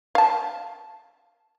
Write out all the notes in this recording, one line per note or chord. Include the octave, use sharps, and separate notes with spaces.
F5 A5